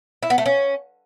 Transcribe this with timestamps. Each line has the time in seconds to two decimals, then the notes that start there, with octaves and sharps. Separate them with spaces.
0.23 E4
0.30 B3
0.38 A3
0.46 C#4